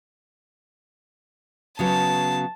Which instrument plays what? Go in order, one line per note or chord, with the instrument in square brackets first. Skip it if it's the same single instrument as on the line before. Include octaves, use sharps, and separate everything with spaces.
[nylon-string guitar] C#3 F#3 B3 [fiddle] A5